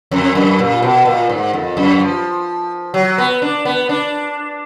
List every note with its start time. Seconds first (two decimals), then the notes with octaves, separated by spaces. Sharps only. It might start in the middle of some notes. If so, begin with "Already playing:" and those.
0.11 F2
0.35 F#2
0.59 A#2
0.82 B2
1.05 A#2
1.29 G#2
1.53 F2
1.77 F#2
1.99 F3
2.94 F#3
3.18 B3
3.42 D4
3.65 B3
3.89 D4